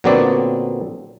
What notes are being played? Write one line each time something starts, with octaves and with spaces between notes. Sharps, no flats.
A#2 D3 F#3 B3 C4 D5